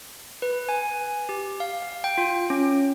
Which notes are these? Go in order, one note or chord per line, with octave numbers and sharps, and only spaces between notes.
B4
G#5
G4
F5
F5
G5
F4
C#4